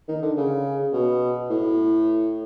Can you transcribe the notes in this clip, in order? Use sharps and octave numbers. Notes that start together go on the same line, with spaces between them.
D#3
D3
C#3
B2
A2